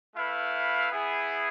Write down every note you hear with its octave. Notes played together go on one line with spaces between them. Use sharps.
A3 E4 B4 F5
B3 E4 G#4